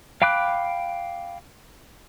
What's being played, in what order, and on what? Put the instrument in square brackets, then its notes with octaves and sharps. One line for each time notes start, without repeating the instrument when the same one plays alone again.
[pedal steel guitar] F5 G5 B5 D6 F#6